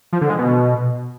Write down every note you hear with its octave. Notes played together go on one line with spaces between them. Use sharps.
F3
D3
G#3
B2